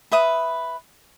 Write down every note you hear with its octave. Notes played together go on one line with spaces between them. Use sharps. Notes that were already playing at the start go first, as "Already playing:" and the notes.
B4 E5 D#6